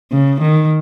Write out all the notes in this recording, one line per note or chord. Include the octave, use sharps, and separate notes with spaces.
C#3
D#3